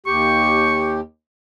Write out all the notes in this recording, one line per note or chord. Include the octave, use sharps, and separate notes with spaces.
D#2 G4 C#6